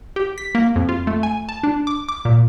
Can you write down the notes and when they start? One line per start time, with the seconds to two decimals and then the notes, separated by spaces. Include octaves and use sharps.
0.16 G4
0.38 B6
0.55 A#3
0.76 F2
0.89 F4
1.07 A3
1.23 G#5
1.49 A5
1.63 D4
1.87 D6
2.09 D6
2.25 A#2